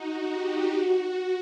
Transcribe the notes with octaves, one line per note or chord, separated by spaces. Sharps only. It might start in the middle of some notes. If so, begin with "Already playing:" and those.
Already playing: D#4 F#4
G4
F#4